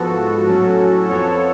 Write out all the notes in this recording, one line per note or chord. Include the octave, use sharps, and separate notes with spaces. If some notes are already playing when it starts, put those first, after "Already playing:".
Already playing: G#2 F3 B3 F#4 A4
A2 F#3 C#4
F2 F3 B3 A4 C#5